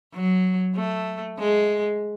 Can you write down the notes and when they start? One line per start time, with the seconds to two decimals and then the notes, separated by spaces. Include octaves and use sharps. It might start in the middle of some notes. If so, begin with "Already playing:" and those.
0.14 F#3
0.76 A3
1.39 G#3